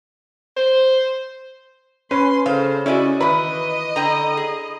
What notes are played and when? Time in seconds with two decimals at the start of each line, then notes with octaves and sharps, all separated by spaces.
0.57 C5
2.11 C#4 B4 C6
2.46 C#3 A4 C5 F5
2.86 C#4 E4 F#4 D5 D#5
3.21 D#3 E3 B4 D#5 B5
3.96 D3 G5 A#5
4.37 G#4